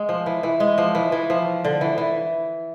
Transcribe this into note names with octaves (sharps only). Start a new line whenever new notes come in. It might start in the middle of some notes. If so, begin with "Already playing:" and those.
Already playing: G#3
F3
E3
E3
G#3
F3
E3
E3
F3
D3
E3
E3